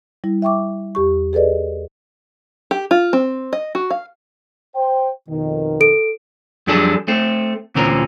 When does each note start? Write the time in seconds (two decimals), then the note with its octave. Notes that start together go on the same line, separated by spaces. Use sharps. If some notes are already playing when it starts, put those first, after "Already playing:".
0.24 G3 E4
0.42 E5 G5 C#6 D6
0.95 E2 G4 C#6
1.33 G#4 A4 B4 D5 D#5
2.71 G4
2.91 F4
3.13 C4
3.53 D#5
3.75 F#4
3.90 F5
4.75 C5 G5
5.29 F2 B2 D#3
5.81 A4 D7
6.67 F2 F#3 G3 D4 G#4 A4
7.08 A3 C4
7.75 D2 A#2 E3 C4 C#4 A#4